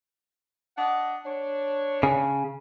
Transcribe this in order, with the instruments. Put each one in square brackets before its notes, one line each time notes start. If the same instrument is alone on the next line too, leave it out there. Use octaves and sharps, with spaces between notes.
[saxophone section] D4 D#5 F#5
D4 C#5
[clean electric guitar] C#3